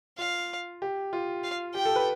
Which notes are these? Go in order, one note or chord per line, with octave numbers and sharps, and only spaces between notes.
F4 F5
G4
F4
F5
G4 G5
A4
B4